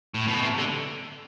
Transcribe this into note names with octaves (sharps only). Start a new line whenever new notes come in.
A2
B2
C3
D3